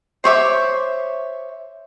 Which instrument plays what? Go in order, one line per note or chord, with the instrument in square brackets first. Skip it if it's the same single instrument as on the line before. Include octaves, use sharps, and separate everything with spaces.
[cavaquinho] C5 C#5 E5 D6